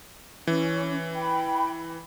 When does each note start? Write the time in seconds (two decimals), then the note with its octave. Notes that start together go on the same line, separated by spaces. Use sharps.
0.47 E3 C#4
1.14 G5 B5